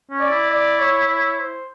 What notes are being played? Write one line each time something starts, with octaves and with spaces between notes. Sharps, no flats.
C#4
D5
E4
D5
C#5
C#5
C5